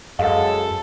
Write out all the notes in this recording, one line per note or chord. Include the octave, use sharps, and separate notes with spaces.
F#2 G#3 A4 F5